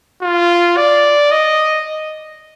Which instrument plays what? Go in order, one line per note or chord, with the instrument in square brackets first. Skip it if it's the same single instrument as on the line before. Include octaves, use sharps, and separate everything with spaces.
[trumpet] F4
D5
D#5